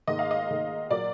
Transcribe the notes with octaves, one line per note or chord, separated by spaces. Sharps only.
G#2 D#3 A#3 D#5
F5
D#5
G#2 D#3 A#3
A#2 F#3 A#3 D5